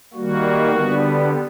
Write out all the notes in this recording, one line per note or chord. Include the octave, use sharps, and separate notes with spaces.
D#3 G3 A#3 F#4
D3 G3 B3